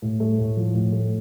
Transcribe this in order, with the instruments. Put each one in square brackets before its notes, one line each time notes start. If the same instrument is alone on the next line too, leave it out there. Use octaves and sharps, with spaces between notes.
[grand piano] A2
A3
A2
F3
A2
A3